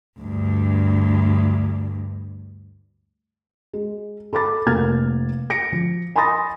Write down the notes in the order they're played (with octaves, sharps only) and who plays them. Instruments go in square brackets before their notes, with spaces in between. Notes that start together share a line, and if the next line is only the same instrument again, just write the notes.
[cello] D2 G2
[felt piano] G#3
A4 B5 D6 A6
F1 A#3 F6 G#6 A6
A#6 C#7 D7
F3
G#5 B5 C6 D#6 A6 A#6